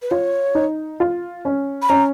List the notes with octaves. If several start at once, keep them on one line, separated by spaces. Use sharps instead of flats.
B4
F4 C#5
D#4
F4
C#4
B5
C#4 A#5